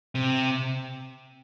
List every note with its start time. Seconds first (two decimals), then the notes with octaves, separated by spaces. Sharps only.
0.15 C3